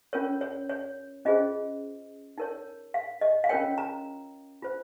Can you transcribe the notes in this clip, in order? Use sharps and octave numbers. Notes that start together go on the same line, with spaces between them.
C#4 F4 A#4 C#5
C#5
C#5
C#4 F4 G#4 C5 D#5
D#4 A#4 C#5
F5
D#5
F5
C#4 F4 A#4 C#5 G5
A#5
F4 C5